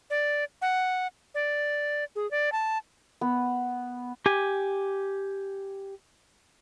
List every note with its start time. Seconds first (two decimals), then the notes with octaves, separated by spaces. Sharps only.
0.10 D5
0.62 F#5
1.35 D5
2.16 G#4
2.31 D5
2.52 A5
3.21 B3
4.26 G4 G#5